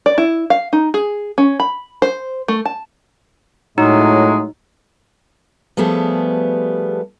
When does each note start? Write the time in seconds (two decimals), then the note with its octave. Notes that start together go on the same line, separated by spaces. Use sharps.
0.06 D5
0.18 E4
0.50 F5
0.73 D#4
0.94 G#4
1.38 C#4
1.60 B5
2.02 C5
2.48 A3
2.65 A5
3.78 A2 F#3 G#3 D#4
5.77 F3 G3 A3 B3 G#4